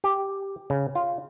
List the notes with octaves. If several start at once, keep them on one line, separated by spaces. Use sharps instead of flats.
G4
C#3
F4